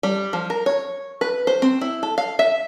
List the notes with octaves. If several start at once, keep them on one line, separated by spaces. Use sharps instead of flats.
G3
F3
A#4
C#5
B4
C5
C4
E4
A4
F5
E5